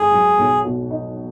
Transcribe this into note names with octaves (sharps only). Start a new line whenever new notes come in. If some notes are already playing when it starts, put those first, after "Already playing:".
Already playing: G#1 G#3 G#4
F#2
B1
B2
D#4